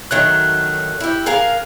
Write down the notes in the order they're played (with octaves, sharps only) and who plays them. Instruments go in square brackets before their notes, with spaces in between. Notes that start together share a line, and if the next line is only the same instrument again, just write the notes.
[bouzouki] D#3 F#3 A3 [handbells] F#6
[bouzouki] E4 G4
G#4 A#4 F5